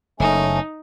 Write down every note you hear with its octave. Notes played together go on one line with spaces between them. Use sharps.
F#1 A3 C#4 D#4